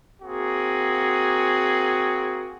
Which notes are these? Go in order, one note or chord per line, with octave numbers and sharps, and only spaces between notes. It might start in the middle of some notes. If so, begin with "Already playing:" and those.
A#3 C4 F#4 G#4